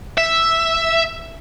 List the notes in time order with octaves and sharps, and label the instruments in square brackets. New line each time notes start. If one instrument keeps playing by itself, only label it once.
[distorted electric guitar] E5